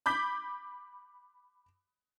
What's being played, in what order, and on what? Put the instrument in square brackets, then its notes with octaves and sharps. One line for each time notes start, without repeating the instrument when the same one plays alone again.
[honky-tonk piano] B5 D6 G6 B6